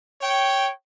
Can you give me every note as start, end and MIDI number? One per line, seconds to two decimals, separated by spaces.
0.22 0.70 73
0.22 0.70 79